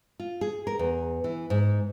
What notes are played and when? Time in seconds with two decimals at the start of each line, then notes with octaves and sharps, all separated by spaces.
0.19 F4
0.41 G#4
0.67 A#4
0.79 E2
1.24 E3
1.50 G#2